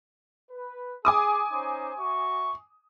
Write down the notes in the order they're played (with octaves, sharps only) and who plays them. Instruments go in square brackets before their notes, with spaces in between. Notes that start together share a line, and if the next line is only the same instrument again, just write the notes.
[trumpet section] B4
[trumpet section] G#4 [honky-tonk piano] G#5 D6 D#6
[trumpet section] C#4 D#4 C5
F#4 E5 C#6